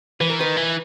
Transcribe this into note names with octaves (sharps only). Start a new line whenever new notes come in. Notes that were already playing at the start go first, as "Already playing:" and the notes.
E3 B4
A#4
D#3 B4
E3